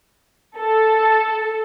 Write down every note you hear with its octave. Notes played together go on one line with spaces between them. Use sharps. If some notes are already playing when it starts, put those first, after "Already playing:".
A4